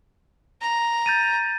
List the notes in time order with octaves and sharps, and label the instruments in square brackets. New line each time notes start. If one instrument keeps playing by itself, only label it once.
[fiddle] A#5
[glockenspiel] G6 A6 D#7